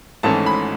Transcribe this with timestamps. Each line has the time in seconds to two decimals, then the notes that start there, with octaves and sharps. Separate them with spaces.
0.23 G#1 G#2 E3 A3 C#4 A5
0.46 B5